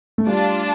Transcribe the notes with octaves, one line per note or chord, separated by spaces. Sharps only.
A3
G3 D4 F4 D5 A5